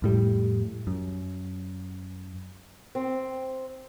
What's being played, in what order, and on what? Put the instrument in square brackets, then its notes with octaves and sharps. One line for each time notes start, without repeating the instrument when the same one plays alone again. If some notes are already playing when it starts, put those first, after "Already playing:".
[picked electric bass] F2 A2 G3
F#2
[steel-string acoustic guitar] C4